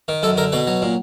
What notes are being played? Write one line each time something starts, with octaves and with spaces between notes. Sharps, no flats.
D#3
F#2 A4
D3 A#4
B2 B4
F#3
A#2